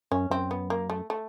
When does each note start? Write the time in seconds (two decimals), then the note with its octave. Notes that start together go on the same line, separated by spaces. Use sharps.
0.12 F#2 C#4
0.30 F#2 C4
0.51 B3
0.70 A#3
0.90 A3
1.10 A3